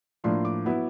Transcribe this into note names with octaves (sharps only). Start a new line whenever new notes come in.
A2 F3 A#3 D4 C6
D6
F#3 B3 E4